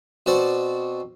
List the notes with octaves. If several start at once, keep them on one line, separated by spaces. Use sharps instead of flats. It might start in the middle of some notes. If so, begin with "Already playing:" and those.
B2 C4 D5